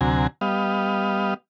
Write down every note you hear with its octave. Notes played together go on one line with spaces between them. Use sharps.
D2 C3 F#3 G#5 A#5
G3 B3 D#5 F5